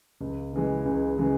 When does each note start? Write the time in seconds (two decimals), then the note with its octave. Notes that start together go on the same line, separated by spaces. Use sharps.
0.21 C#2
0.53 C#3 E3 G#3
0.86 C#2
1.18 C#3 E3 G#3